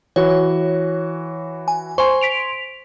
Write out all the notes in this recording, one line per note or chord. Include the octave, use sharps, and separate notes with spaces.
E3 F#4 C#5
G#5
C5 G#5 C6 C#6
B6 D7 F7